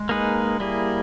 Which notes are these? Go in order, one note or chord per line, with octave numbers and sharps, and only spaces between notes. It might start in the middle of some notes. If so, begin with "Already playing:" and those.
Already playing: G#3
A#3 D#4 G#4 B4
G3 A#3 E4 G#4